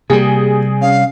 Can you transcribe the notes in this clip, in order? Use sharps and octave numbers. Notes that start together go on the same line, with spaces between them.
C3 G3 A#3 G4 G#4
C#4 F5